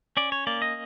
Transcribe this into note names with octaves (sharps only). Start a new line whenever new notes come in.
C#4 D5
C#5
A#3 D5
D#5